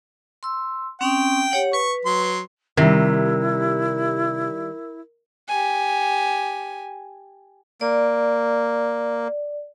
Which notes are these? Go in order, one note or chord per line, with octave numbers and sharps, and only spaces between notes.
C6 E6
C4 C#4 G5 D#6
G4 C#5 F#5
B4 C#6
F#3 C6
C3 D#3 G3 E4 A#4
G4 G#5
A#3 D5